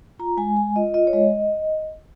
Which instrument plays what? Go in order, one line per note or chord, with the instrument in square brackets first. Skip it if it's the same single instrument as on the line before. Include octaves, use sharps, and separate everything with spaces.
[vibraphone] F4 A#5
G#3 G#5
G#3 G#5
F4 D#5
F4 D#5
C#5
G#3 D#5